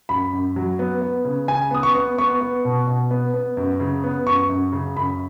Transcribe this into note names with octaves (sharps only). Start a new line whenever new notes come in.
F#2 B5
F#2
F#3
B3
B3
C#3
C#3 G#5
B3 D#6
C#6
B3
B3 C#6
B3
B2
B2
B3
B3
F#2
C#3
B3
F#2 C#6
F#2
C#3
F#2 B5